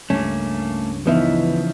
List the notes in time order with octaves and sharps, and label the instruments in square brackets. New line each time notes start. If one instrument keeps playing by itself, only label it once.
[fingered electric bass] C#2 G2 [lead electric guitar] A3 A#3 [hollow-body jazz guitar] C#4
[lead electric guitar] C#3 F3 [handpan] E3 D#4 E5 [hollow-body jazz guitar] B3